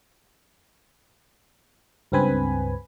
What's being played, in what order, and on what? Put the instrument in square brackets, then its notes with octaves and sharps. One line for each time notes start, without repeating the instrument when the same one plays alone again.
[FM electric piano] C#2 G2 C4 B4 G#5 B5